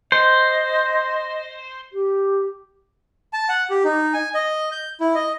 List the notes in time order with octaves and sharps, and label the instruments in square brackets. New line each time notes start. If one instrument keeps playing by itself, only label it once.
[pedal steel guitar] C5 [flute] D#5
[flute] G4
[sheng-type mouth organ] A5
F#5
G4
D#4
G#5
D#5
G6
E4
D#5